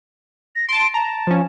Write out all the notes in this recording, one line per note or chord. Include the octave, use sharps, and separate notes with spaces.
A#6
A5 C6 D7
A5 A#5
F3 C#4